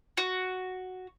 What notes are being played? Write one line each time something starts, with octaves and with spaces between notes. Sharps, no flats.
F#4